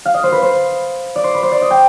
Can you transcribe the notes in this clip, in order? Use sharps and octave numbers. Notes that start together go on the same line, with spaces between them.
F5
D#5
C5
B4
C5
D5
C5
B4
C5
D5
D#5
G5